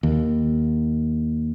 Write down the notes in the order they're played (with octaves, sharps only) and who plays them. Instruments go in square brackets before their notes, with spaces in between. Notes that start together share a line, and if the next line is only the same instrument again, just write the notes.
[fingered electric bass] D#2